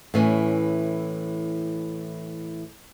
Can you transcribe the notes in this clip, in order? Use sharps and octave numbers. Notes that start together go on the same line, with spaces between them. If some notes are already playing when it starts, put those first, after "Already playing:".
A2 E3 C#4